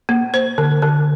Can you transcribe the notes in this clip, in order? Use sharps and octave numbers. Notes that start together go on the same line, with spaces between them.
A#3
C5
D3
D3